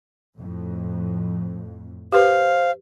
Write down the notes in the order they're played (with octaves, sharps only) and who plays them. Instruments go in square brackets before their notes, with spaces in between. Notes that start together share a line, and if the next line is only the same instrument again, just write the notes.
[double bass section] F2 A2
[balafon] G4 B4 [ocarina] C5 [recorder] F5